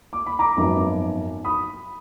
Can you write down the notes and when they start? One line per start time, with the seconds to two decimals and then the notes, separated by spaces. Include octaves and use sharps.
0.13 D6
0.26 B5
0.39 A#5 D6
0.57 G#1 F#2 F3 B3 D#4
1.44 B5 D#6